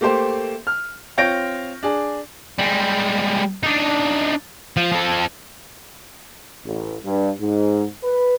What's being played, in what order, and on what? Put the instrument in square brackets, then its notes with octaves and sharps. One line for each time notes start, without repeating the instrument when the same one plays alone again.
[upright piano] A3 A#3 G4 C5
F6
C4 F4 C#5 G6 A#6 D7
D4 G#4
[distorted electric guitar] G3 G#3
D4 D#4
F3
F3 A4
[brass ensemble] A1
G2
G#2
B4